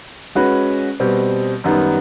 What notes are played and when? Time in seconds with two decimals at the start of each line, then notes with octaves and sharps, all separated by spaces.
0.35 G#3 C#4 F#4 B4
1.00 B2 G3 C4
1.64 F#2 D#3 G3 B3